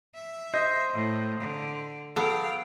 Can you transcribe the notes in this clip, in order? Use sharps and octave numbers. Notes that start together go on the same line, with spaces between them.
E5
C5 D#5
A2
D3
F#3 B3 A4 F5 G5